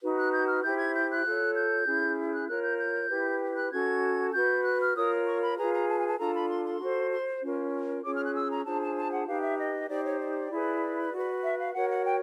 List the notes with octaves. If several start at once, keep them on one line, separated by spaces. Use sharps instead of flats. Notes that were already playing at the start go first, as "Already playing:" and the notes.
D#4 F#4 B4
F#6
G6
F6
E4 G4 C5 G6
G#6
G6
F#6
F4 A4 C#5
G6
C#4 E4 G#4
F#6
F4 A#4 C#5 F#6
G6
G6
E4 G4 B4
F#6
C#4 F#4 A4 G#6
F#4 B4 G6
F#6
F6
F4 A#4 C#5 D#6
C#6
B5
F4 G#4 B4 A#5
A#5
A5
G#5
A5
D4 F4 A4 A#5
B5
C6
C6
F#4 A4 C5
C6
C#4 F4 A#4 C#5
C#4 F4 G#4 C#5 D6
F6
F#6
E6
A#5
D4 F4 G#4 C5 A5
A5
A5
F#5
D#4 G4 B4 F5
E5
D#5
D#4 G4 C5 D5
C#5
D5
E4 G#4 B4
F#4 B4
E5
F5
F#4 A#4 C#5 F#5
F#5
G5